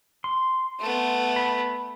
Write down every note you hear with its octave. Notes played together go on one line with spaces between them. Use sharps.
C6
A3 B3
B5